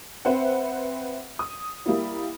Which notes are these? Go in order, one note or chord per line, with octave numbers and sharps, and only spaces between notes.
C4 B4 C5 E5 F#5
D#6
G3 A#3 E4